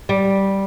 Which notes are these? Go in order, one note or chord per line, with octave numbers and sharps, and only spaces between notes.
G3